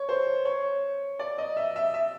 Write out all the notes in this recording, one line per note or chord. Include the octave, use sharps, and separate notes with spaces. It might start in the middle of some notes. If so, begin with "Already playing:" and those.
Already playing: C#5
C5
C#5
D5
D#5
E5
E5
E5